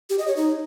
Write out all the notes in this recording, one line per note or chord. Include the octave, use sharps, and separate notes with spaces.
G4
D#5
C#5
D#4